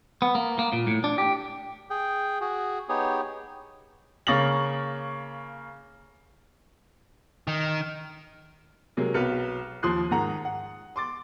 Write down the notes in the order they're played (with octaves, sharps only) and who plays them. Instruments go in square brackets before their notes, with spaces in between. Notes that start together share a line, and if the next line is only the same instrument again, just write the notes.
[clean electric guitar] B3
A#3
A#3
A#2
A2
D4
G4
[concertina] G#4 G5
F#4 G#4
B3 D#4 G4 G#4 C#5
[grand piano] C#3 A#3 C#6 A6 A#6 F#7
[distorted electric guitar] D#3
[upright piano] C3 F#3 G#3 A#3
B1 F#3 B4 F6 C#7
D#2 F3 C6 D#6 F#6 C7
G#2 D#3 F#5 A#5
F#5
C6 D6 A6